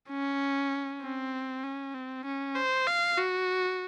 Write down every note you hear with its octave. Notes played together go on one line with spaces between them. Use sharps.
C#4
C4
C#4
C4
C#4
C5
F5
F#4